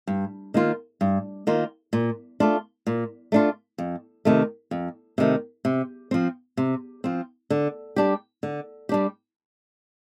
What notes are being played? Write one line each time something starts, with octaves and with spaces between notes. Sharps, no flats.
G2
D#3 A#3 F4
G2
D#3 A#3 F4
A#2
A3 D4 F4
A#2
A3 D4 F4
F2
C3 D#3 A3
F2
C3 D#3 A3
C3
F3 C4
C3
F3 C4
D3
G3 D4 G4
D3
G3 D4 G4